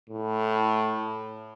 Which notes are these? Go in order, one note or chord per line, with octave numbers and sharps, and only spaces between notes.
A2